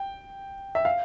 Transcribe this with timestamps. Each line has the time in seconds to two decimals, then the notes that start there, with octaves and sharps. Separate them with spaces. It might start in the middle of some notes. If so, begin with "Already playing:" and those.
Already playing: G5
0.75 E5
0.85 F5